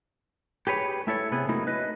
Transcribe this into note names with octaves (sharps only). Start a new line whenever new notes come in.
G4 G#4 B4 C#5
A3 E4 A4 C#5
C3 B3 G#4
F#3 A3 A#3 D#4 E4 F#4
B4 D#5